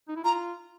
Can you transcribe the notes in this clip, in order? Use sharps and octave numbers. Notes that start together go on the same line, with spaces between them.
D#4
E4
F4 A#5